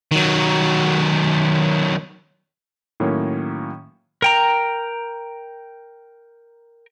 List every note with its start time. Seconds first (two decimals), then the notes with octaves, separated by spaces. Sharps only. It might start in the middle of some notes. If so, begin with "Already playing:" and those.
0.12 D#3 F#3
3.00 A2 D#3 F#3 A#3 C#4
4.22 A#4 G5 A#5